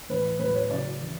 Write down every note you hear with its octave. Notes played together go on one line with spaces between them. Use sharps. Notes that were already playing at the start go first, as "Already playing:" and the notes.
A2 E3 B4
A2 F#3 B4
C#5
C#3 F#3 D5
E3